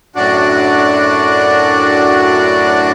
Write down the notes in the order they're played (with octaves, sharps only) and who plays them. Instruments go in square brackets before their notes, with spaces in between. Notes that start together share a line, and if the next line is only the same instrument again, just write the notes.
[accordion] F#2 A2 D4 F#4 D5